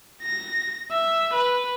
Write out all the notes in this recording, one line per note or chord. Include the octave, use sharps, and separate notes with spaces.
A#6
E5
B4